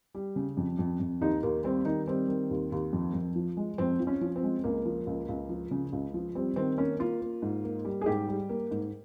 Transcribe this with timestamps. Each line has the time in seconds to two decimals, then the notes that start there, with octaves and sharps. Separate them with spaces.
0.15 G3
0.36 C#3
0.57 F2
0.79 F2
1.00 F2
1.21 D#2 D#4
1.43 D#2 A#3
1.64 G3 C4
1.85 D#3 D#4
2.08 G3 C4
2.28 D#3
2.50 D#2
2.72 D#2
2.93 F2
3.14 F2
3.36 F3
3.57 G#3
3.78 F2 C4
4.00 F3
4.07 C#4
4.21 F3
4.36 C4
4.43 G#3
4.64 C#2 A#3
4.85 F3
5.07 C#2
5.29 C#2
5.49 F3
5.71 C#3
5.93 C#2
6.14 F3
6.35 G3 C4
6.56 D#3 C4
6.78 A#3 C#4
6.99 A#3 F4
7.21 A#3
7.42 G#2
7.64 A#3
7.85 G3
8.01 G#4
8.06 G#2 G4
8.28 G3
8.49 A#3
8.71 G#2